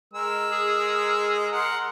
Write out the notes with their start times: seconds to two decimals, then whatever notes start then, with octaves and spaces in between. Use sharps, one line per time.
0.13 G#3 A#4 E6
0.51 G#4
1.52 A#4 F#5 C6